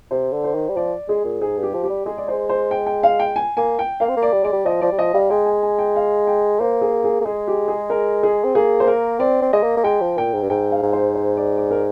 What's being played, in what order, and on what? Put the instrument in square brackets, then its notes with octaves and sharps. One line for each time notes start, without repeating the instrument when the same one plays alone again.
[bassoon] C3 [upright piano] C5
[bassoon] D3
[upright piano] C5
[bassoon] D#3
G3
[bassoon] F3 [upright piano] D5
[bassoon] G#3 [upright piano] G#4
[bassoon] A#2
[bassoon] G#2 [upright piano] G#4
[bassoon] G2
[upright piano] G4
[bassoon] F3
[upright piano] G4
[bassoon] G3
[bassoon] G#3 [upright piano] G#4
[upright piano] D5
C5
C5
G5
G5
F5
G5
G#5
[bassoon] A#3 [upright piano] G#5
[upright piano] G5
[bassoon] A#3 [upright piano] F5
[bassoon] C4
A#3
[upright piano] D5
[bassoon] G3
[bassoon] G#3 [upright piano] D5
[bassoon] G3
[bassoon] F3 [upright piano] D#5
[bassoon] F3 [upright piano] D5
[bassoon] G3
[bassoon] F3 [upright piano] D#5
[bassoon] G3 [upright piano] F5
[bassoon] G#3 [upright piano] G5
[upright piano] G#5
G#5
G5
F5
G5
[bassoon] A#3 [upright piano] C5
[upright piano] G#4
G#4
[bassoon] A#3
[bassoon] G#3 [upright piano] G#4
[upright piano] G4
G#4
A#4
G#4
[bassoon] C4
[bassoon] A#3 [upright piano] G#4
[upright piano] C5
A#4
[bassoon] C4 [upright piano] D5
[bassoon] C4
[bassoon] G#3 [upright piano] D#5
[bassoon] A#3
A#3
[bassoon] G#3 [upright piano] G5
[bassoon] F3
[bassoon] A#2 [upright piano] G5
[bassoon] G#2
G2
[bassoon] G#2 [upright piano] G5
[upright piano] F5
[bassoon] G#2
[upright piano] C5
C5
D5
D5
A#4